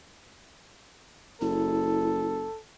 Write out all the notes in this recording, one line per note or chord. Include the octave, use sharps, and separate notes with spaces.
F#1 E4 A4